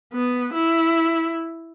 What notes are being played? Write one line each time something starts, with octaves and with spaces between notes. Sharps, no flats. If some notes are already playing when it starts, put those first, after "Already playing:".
B3
E4